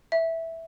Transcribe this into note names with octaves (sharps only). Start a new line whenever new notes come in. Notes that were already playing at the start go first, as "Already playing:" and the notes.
E5